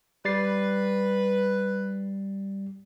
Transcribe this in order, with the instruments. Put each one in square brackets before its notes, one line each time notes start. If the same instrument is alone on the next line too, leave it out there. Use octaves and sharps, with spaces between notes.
[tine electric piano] G3 A6 C7 [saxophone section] B4